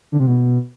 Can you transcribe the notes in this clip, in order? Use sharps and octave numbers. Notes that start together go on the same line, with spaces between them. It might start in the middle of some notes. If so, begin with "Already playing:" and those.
D3
C3
B2